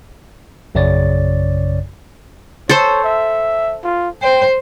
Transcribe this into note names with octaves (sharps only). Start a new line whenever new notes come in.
A#1 F#2 C#3 C#5 D5 A6
A4 C5 C#5
E5
F4
C5 G5